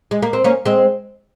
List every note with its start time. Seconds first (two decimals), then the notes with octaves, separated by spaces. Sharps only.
0.11 G#3
0.22 A#3
0.33 C4
0.44 A#3 C#4
0.65 G#3 C4